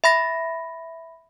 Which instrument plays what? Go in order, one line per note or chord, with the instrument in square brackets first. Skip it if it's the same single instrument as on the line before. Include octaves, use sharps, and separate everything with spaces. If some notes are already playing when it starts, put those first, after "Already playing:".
[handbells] E5 B5 A#6